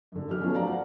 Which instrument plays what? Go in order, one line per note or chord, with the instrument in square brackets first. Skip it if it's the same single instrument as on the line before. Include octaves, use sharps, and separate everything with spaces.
[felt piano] F#2 D3
E3 G4 F6
F3 F#3 A3 B3 C#4 D#4
F#4 C5 D5 F5 A#5
F#5